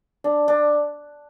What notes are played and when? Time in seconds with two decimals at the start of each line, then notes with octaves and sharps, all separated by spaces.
0.24 D4
0.48 D4